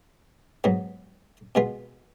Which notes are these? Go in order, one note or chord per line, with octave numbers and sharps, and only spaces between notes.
G#2 F#3 B3
B2 G#3 B3 F4